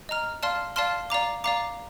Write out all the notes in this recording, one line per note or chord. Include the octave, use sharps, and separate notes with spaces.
D#5 A#5 F6
D5 F5 A5 C6 F6
D5 F5 A5 C6 F6
D5 F5 A#5 D6
D5 F5 A#5 D6